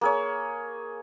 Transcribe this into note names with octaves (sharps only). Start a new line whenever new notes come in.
A#3 G#4 C#5